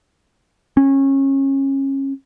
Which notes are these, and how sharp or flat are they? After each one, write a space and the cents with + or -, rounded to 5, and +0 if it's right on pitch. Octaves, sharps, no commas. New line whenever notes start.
C#4 -25